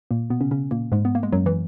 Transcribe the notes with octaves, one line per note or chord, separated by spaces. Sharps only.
A#2 A#3
B2 B3
C#3 C#4
C#3 C#4
A#2 A#3
G#2 G#3
B3
A#3
G#3
F#2 F#3
E3